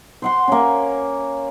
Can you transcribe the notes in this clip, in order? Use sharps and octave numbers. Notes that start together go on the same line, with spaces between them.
C5 F#5 C6
A#3 C#4